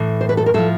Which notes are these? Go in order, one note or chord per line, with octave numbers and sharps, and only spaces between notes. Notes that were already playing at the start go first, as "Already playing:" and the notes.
Already playing: A2 E3
C5
B4
A4
A#4
A2 F3 A4